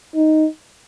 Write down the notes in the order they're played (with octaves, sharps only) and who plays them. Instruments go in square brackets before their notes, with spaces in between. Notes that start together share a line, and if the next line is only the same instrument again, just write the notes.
[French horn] D#4